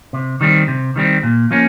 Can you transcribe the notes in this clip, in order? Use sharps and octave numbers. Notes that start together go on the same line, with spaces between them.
C3
D#3 G3 C4
C3
D#3 G3 C4
A#2
F3 A#3 C#4